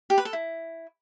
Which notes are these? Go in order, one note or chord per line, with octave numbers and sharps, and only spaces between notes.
G4
B4
A4
E4